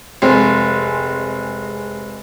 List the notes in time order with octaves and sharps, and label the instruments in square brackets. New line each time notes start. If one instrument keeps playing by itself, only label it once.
[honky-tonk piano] F1 G#3 C4